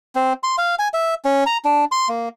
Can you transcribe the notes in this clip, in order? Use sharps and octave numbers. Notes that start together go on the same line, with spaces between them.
C4
C6
F5
G#5
E5
C#4
A#5
D4
C6
A#3